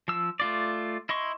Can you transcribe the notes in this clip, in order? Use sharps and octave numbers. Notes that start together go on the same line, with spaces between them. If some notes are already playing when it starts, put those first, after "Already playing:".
F3 E6
A3 F4 D5
E4 D#5 C6 C#6